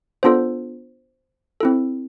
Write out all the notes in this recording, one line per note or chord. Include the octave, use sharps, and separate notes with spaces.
B3 D4 F4 A4 C5
C4 E4 A4